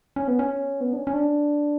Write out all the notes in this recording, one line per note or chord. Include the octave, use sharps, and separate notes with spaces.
C#4
B3
C#4
B3
D4
C#4
C#4
D4